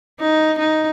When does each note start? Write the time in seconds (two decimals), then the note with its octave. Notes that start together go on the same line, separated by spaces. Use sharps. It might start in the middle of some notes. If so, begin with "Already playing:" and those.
0.20 D#4
0.59 D#4